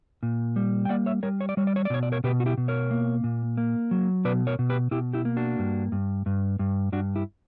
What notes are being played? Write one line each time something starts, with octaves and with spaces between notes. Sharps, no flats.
A#2
G3
G5
A#3 D5 F#5
C#5 E5
G3 A#4 C#5
C#5
D5
G3 C#5
D5
C#5
D5
B2 C#5
D5
A#4 C#5
B2 G4 B4
F#4
E4 G4
B2
A#4 C#5
A#3
A#2
A#3
F#3
B2 B4 D5
A#4 C#5
B2
G4 B4
B2 E4 G4
E4 G4
A#3
D4 F#4
G2
G2
G2
G2
G2 D4 F#4
E4 G4